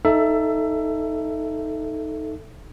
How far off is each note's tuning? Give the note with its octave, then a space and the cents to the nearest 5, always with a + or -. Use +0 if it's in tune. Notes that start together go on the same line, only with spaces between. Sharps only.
D#4 +5 A4 +0 E5 +20